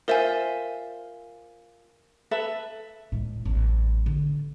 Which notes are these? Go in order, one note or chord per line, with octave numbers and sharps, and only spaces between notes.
F4 A#4 C5 E5 G#5
A4 B4 E5
A2 G#3
A1 F#3
D3